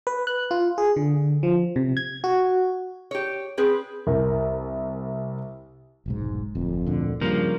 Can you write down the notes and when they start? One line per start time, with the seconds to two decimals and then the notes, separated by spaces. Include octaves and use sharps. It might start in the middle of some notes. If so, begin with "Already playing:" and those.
0.07 B4
0.27 F#6
0.51 F4
0.78 G#4
0.96 D3
1.43 F3
1.76 C3
1.97 G#6
2.24 F#4
3.11 G4 C#5
3.58 C4 G#4 B4
4.07 C2 A#4
6.06 F1 B1 G#2
6.55 D1 F2
6.86 D2 A#2 D3
7.21 G2 C#3 F3 A#3